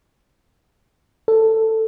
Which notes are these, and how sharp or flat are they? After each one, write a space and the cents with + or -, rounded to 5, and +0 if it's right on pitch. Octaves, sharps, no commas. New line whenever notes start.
A4 +10